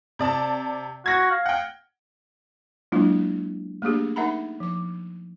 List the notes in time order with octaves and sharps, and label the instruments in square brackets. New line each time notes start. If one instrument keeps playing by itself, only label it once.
[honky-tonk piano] C3 D5 A5
[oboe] F#4 [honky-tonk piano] G#6 A#6
[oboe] F5
[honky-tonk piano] F#5 G5
[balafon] F#3 G#3 A#3 D4 E4 F4
A3 A#3 D4 G4 G#4
D#4 A#4 E5 F#5 A#5 B5
F3 D6